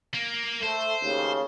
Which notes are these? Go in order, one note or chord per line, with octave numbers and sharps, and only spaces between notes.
A#3
A3 C5
D#2 A2 C#3